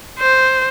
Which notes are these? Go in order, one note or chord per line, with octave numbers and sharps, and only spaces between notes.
C5